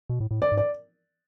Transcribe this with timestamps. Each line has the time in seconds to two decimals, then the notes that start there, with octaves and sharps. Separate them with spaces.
0.10 B2
0.20 A2
0.31 A2
0.42 D5
0.52 G#2
0.57 D5